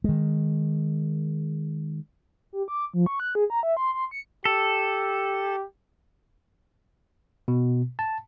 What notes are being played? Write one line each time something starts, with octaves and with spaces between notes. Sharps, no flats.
D#3 G#3
G4
D6
F3
C#6
F#6
G#4
A#5
E5
C6
C6
C#7
G4 A4
B2
A5